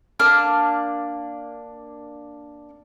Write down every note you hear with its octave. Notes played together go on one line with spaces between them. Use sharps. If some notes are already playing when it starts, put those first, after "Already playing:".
A#3 D4 D6 F6